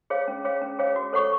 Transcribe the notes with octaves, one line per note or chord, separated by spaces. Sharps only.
G#4 C#5 F5
C#4
G#4 C#5 F5
C#4
G#4 C#5 F5
F#4
A4 C#5 F#5 C#6